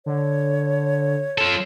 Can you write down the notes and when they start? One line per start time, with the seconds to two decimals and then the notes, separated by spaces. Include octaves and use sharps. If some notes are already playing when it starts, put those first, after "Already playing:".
0.06 D3 C#5
1.38 F3 A4